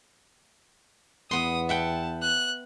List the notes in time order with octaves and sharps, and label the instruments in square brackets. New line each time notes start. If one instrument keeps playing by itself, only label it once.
[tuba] E2 [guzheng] B3 C6 [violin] D#6
[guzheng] E5 F#5 G5 [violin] A5
[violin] F#6